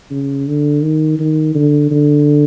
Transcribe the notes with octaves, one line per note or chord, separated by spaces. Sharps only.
C#3
D3
D#3
D#3
D3
D3